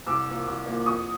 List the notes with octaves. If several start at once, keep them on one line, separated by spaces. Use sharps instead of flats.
C2 D6 E6
A#2 F3 A#3
C2
A#2 F3 A#3
F2 C#6 D#6